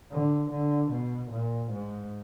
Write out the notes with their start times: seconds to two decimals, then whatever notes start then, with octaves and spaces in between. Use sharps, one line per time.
0.12 D3
0.51 D3
0.92 B2
1.31 A#2
1.72 G#2